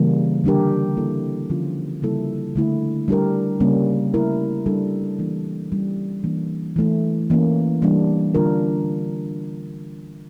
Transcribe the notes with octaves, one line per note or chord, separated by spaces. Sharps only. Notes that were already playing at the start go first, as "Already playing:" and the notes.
Already playing: C#3 E3 G3 A#3
D3 G3 D4 G4 A#4
G3 A#3 E4 A4
D3 F3 C#4 F4
C#3 G3 A#3 E4 A4
D3 A3 E4
G3 D4 G4 A#4
C#3 G3 A#3 C#4
A3 E4 A#4
G3 D4 A4
E3 A#3 D4
G3 C#4 E4
E3 A#3 D4
E3 A3 E4
E3 A#3 C#4
E3 G3 A#3 D4
D3 G3 D4 F4 A#4